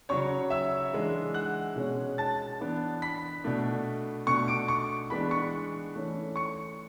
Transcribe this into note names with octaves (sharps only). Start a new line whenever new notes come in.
C#3 F#3 C#4 C#5 C#6
E5 E6
E3 G#3 D4
F#5 F#6
B2 G#3 C#4
A5 A6
E3 B3 D4
B5 B6
B2 A3 D4
B2 A3 D4 C#6 C#7
D6 D7
C#6 C#7
E3 G#3 B3 D4 B5 B6
C#6 C#7
E3 A3 C#4
C#6 C#7